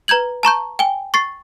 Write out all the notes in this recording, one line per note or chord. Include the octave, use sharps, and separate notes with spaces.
B4 A#5 G6 G#6 F#7
A5 A#5 C#6 G6
G5 G#5 G7
C#6 A6 C7